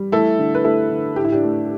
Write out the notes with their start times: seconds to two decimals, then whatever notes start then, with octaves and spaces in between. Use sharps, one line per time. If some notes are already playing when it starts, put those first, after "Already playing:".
Already playing: G3
0.12 A3 E4 A4
0.39 D3
0.55 B4
0.64 A3 E4 A4
0.91 D3
1.16 A2 G4
1.24 E4
1.32 D4 G4
1.43 A3